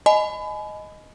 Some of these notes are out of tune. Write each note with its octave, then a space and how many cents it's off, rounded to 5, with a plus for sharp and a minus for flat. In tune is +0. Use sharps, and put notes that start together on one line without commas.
D#5 +0 G#5 +30 B5 +25